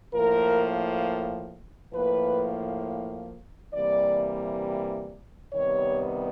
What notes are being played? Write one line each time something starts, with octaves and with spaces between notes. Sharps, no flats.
A2 F3 A#3 A#4
A2 F3 A#3 B4
C3 E3 G3 A#3 D5
C3 D#3 G3 B3 C#5